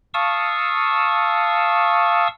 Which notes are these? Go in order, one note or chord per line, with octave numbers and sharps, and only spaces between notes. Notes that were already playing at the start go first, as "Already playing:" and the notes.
F5 A5 C#6 D#6 E6